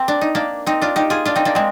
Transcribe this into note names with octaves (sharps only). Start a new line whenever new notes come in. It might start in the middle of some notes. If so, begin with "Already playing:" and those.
Already playing: A#3 C4
D4
D#4
A#3 D4
C4 D#4
D4 F4
D#4 G4
F4 G#4
D4 F4
C4 D#4
A#3 D4
G#3 C4